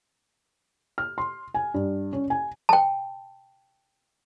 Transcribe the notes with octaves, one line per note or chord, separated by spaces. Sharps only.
F6
C6
G#5
G2
C#4
G#5
G5 A5